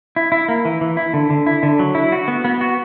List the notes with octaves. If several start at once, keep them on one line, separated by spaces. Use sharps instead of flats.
E4
E4
A#3
E3
E3
E4
D3
D3
E4
D3
F#3
E4
F#4
B3
B3
F#4